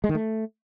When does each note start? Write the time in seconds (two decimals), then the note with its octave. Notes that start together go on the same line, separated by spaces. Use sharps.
0.04 G#3
0.09 D#3
0.15 A3